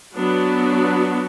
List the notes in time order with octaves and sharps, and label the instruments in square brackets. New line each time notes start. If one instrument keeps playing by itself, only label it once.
[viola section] F#3 B3 D4 F#4